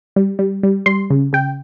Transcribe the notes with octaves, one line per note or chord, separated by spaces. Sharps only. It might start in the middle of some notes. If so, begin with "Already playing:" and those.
G3
G3
G3
G3 C6
C#3
C#3 G5